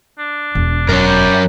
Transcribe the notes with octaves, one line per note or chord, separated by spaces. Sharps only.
D4
E1
F#2 A#4 C#5
G3